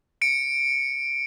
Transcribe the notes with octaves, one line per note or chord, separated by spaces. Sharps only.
C#7 D7